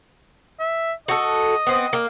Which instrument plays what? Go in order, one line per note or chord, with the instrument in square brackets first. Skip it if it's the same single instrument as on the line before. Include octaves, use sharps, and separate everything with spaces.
[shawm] E5
[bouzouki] F#4 A4 [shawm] D#5
[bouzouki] B3 C4
A#3